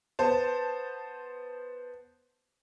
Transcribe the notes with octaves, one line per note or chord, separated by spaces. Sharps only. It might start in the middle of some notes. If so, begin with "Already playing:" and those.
B3 C5 A5